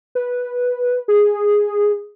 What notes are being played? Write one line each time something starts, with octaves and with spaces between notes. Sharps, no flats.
B4
G#4